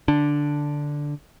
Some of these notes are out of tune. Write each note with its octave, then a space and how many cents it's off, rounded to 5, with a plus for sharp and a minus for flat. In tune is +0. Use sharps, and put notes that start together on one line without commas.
D3 +0 D4 -5